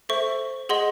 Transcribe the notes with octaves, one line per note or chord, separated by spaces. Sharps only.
A4 C5 E5 C#6
G#4 D#5 F#5 C6